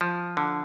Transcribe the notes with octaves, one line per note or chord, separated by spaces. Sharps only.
F3
D3